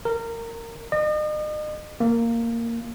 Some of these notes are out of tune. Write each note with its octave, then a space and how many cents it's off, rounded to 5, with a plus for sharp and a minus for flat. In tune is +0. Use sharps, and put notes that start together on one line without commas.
A#4 -20
D#5 -40
A#3 -10